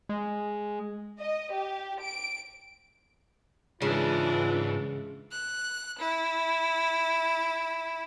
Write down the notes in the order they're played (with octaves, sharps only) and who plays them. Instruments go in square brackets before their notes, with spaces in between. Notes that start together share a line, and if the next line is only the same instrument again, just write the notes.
[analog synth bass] G#3
[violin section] D#5
G4
D7
[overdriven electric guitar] G#2 [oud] C#3 [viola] E3 D4 [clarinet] F4
[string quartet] F#6
E4